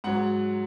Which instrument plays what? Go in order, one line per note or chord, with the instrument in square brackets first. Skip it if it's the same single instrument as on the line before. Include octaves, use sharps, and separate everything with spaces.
[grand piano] G#2 F#3 F#5